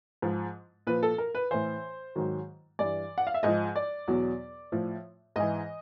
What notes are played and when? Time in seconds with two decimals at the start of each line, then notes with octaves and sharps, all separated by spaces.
0.22 G#2 F3
0.87 A#2 F3 B4
1.03 A4
1.18 A#4
1.35 B4
1.51 A2 E3 C5
2.15 G#2 D#3 F#3
2.79 G2 E3 D5
3.18 F#5
3.27 F5
3.34 E5
3.43 G#2 F3 D#5
3.76 D5
4.08 E2 B2 F#3
4.72 A2 F3
5.36 G#2 E3 D#5